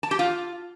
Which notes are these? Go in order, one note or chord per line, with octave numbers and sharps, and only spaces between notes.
A5
G4
F4